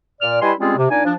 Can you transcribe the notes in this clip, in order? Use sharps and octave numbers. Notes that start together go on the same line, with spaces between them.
A#2 D5 F6
G3 E4 B4 D#5 G#5 C6
G3 G#3 C4 C#4 F4 G#4
C3
A#2 D4 D#4 D5 G#5
F3 D4